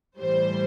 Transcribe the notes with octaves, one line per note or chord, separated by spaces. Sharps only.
A2 E3 G3 C5